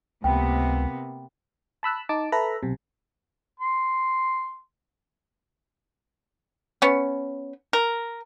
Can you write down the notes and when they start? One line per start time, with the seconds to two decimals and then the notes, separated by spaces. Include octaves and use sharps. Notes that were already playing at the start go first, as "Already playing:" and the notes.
0.24 C#2 C3 A#3 B3 G5
1.83 A5 B5 E6 F#6
2.09 D#4 A5 D6
2.32 A4 B4 E5 A#5 B5
2.63 B1 C3
3.60 C6
6.82 B3 C#4
7.73 A#4